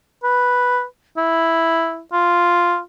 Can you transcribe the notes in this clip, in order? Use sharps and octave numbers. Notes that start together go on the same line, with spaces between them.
B4
E4
F4